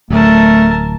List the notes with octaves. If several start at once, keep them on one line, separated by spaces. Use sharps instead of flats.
D1 A3 A#4 A5